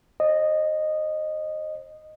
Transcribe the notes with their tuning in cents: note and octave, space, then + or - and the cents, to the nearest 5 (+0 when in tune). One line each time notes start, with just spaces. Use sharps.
C5 +35 D#5 -10